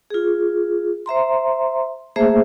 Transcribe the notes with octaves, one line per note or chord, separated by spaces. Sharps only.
F4 G#4
C5 E5 A#5 C6
A3 A#3 G#4 C5 E5